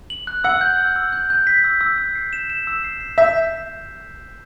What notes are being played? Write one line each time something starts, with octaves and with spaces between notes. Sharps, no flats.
F#7
F#6
F#5 E6
G6
E6
E6
G6
G6
B6
E6
E6
E6
C7
E7
E7
E6
C7
C7
E5 G6